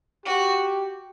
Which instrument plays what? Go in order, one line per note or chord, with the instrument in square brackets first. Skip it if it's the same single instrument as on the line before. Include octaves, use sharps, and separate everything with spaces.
[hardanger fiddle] F#4 [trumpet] G4